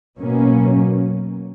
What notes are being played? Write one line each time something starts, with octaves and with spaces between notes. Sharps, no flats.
B2 F#3 A#3 C#4